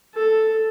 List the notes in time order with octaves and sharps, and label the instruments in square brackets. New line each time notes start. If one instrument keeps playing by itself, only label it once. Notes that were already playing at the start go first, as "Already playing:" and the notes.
[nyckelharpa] A4